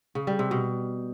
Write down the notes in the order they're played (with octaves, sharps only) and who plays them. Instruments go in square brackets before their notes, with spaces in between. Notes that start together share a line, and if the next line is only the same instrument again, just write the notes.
[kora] C#3
G3
C3
B2